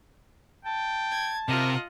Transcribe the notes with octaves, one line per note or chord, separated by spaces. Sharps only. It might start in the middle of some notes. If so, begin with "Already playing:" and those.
G5 A5
G#6
C3 F4 A#4 D#5 F#5